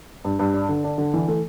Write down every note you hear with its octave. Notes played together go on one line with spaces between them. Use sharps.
G2
G2
D4
D3
D4
D3
E3
A3